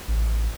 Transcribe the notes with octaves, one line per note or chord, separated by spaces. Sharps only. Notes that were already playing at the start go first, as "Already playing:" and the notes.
A1